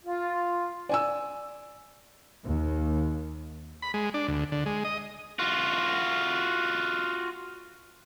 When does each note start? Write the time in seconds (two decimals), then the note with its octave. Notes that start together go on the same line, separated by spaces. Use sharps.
0.05 F4
0.89 D5 G#5 E6
2.43 D#2
3.82 B5
3.94 G#3
4.14 D4
4.28 D2
4.52 D3
4.66 G#3
4.85 D#5
5.39 F4 F#4